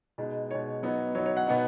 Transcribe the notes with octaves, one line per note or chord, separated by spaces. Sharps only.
B2 G#3 D#4
B2 G#3 D#4 C#5
F#3 B3 D#4
F#3 B3 D#4 C#5
C#5
F#5
B2 B3 D#4